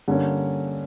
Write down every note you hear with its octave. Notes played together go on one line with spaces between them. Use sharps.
G2 D3 A#3 C#4